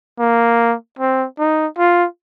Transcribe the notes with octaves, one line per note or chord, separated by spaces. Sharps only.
A#3
C4
D#4
F4